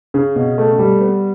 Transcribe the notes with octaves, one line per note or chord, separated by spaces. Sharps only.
C#3
B2
A3
G3
B3